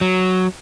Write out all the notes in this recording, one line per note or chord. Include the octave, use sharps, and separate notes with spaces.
F#3